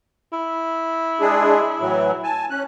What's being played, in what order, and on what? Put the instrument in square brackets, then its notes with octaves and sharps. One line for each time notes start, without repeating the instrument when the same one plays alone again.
[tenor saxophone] E4
[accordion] G#3 D4 G#4
A2 E3 F#3
G#5 A5
C#4 F#6